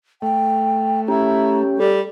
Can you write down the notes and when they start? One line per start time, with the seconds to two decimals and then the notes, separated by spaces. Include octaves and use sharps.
0.22 A3 G5
1.08 C#4 E4 G4 A#5
1.78 G3 A4